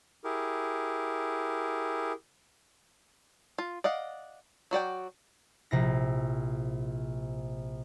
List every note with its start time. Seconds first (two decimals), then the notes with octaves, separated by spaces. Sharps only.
0.24 E4 G4 G#4 A#4
3.58 F4
3.84 D5 D#5 F5 F#5
4.71 F#3 F#4 D5 G5
5.71 A#1 C3 E4 A#6